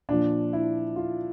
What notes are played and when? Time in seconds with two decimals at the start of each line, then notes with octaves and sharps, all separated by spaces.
0.09 A#2 F3 D4
0.53 E4
0.96 F4